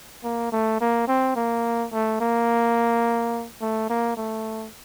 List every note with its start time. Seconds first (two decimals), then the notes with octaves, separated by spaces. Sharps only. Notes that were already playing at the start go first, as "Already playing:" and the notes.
0.24 A#3
0.52 A3
0.81 A#3
1.08 C4
1.36 A#3
1.93 A3
2.21 A#3
3.61 A3
3.90 A#3
4.17 A3